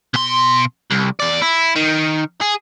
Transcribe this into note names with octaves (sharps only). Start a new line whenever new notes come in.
B2 C6
C2
E2 D5
E4
D#3
G#4